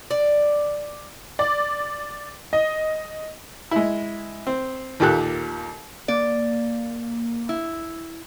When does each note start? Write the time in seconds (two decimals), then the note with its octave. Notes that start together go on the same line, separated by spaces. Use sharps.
0.11 D5
1.39 D5
2.53 D#5
3.71 G#3 E4
4.47 C4
5.00 D#2 A#2 G4 A4 F#6
6.08 A#3 D5
7.49 E4